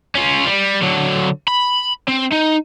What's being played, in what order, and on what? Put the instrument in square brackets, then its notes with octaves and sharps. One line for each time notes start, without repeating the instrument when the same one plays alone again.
[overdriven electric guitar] C#4 F4
G3
D3 F#3
B5
C4
D#4